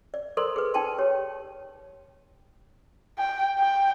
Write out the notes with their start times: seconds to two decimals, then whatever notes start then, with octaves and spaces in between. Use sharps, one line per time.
0.14 D5
0.37 A4 A#4 C5 D5 A#5 C6
0.56 G#4 B4
0.74 D#4 G5 A5 C6
0.98 G4 C#5
3.18 G5
3.59 G5